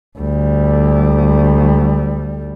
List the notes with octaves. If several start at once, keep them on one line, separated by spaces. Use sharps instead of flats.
D2 G3